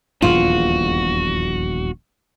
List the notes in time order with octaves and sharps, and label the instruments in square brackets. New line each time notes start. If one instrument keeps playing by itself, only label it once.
[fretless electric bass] D#1 A#1 E2 [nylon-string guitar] F4 [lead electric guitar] F#4